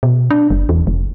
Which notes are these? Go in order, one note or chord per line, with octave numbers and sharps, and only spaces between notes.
B2
D4
F#1
E2
F1